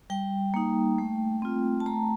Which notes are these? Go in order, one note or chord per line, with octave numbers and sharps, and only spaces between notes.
G3 G5
A#3 D#4
A3
C4 F4
A5
A3 A#5